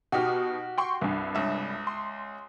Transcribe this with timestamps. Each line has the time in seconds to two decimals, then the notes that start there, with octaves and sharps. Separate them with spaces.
0.12 B2 D#4 F#4 G4 F6
0.78 G5 C6 C#6
1.01 C2 G2
1.35 C#2 E5
1.87 C6